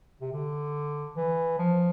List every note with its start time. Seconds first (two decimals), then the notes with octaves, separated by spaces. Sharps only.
0.21 C3
0.33 D3
1.16 E3
1.58 F3